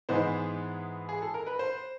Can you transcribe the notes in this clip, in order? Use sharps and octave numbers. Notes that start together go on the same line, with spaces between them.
G#2 E3 G#3 B3 C5
G#4
A4
A#4
B4
C5